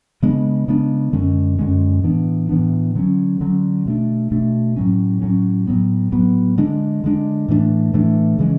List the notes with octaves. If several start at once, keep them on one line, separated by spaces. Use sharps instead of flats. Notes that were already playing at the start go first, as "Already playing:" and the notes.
C#3 G#3 B3 D4
C#3 G#3 B3 D4
F#2 D3 G#3 C#4
F#2 D3 G#3 C#4
A2 E3 B3 D4
A2 E3 B3 D4
D3 F#3 C#4
D3 F#3 C#4
B2 A3 D4
B2 A3 D4
A2 F#3 C#4
A2 F#3 C#4
A2 F#3 B3
A2 F#3 B3
D3 G#3 D4
D3 G#3 D4
A2 E3 A3 D4
A2 E3 A3 D4
C#3 E3 G#3 C#4